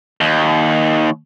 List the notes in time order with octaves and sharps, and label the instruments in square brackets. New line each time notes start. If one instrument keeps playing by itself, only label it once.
[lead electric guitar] D#2